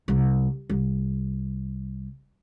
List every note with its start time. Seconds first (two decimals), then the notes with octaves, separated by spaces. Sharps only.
0.08 C2
0.70 C2